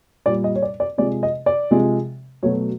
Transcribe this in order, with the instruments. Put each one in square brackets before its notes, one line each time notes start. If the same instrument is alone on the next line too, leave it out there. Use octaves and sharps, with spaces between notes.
[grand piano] A#2 G3 D5
D#5
C#5
D5
D5
C3 F3 G#3 D5
D#5
D5
C3 F3 G#3
B2 F#3 A3 C#5